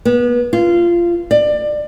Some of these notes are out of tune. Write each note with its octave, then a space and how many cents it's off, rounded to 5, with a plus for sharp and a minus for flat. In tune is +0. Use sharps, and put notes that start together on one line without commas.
B3 -30
F4 -20
D5 +25